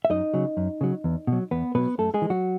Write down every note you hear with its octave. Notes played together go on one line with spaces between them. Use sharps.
E5
F#2 D#4 D#5
C#3 F#3
F#2
C#3 F#3
E2
B2
F#3
E2 B3 B4
B2 F#3 B3 B4
F#2 A3 A4
G#3 G#4
E3
F#3 F#4